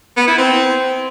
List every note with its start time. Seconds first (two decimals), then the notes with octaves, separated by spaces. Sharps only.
0.17 B3
0.27 E4
0.38 C4